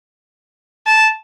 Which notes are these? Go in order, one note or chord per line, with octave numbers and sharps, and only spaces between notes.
A5